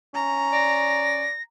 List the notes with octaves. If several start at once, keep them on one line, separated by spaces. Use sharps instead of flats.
C#4 A#5
D5 A#6